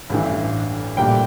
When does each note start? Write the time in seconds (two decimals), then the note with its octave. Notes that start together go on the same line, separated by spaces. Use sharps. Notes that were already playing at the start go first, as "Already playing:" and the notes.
0.10 A1 G2 E3
0.97 A#1 A2 G3 A#3 G5